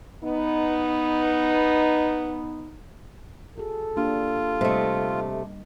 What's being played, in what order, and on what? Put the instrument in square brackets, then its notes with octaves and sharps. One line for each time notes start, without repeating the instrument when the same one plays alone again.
[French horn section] B3 D#4
[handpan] F#4 G#4 [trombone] A4
[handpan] A#3 D4 G4 [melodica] F4
[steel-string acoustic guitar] C3 A3 [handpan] G3 D#5